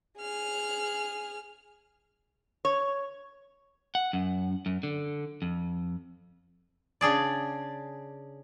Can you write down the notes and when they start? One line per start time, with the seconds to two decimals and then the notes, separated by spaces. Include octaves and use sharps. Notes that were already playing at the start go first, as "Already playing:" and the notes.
0.17 G#4 F6
2.65 C#5
3.95 F#5
4.13 F#2
4.66 F#2
4.83 D3
5.42 F2
7.01 C#3 D4 G#4 D5